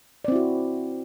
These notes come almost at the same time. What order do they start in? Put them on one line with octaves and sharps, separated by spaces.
D5 C4 E4 F#4